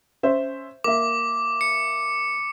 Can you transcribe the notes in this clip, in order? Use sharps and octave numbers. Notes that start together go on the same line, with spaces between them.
C#4 C5 E5
A#3 E5 D6
C#7